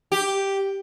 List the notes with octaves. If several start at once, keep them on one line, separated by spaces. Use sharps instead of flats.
G4